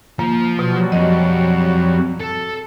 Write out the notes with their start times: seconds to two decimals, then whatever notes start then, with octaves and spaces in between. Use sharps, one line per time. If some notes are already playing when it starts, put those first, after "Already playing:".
0.19 F3 A#3
0.59 B2 F#3 G3 F#4
0.92 F2 D#5
2.20 A4